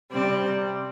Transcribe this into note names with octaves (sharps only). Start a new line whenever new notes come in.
C3 G3 C4 D5